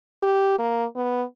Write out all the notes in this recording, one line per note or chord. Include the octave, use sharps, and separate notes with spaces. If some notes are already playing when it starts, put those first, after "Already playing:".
G4
A#3
B3